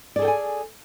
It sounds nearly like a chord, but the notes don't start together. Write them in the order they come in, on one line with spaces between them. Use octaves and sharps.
D5 G#4 A4 G5 G#5